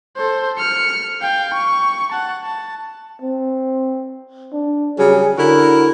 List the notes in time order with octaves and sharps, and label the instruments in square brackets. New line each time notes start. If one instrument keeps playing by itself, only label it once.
[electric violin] A4 C5
F6 C#7
F5 G5
C#6
F#5 A5
A5
[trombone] C4
D4
[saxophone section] C#3 F#3 G3 [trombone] G#4
[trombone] D3 [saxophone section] E4 F#4 A#4